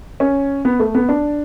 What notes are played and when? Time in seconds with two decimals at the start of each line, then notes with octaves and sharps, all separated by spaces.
0.20 C#4
0.65 B3
0.80 A3
0.95 B3
1.09 D4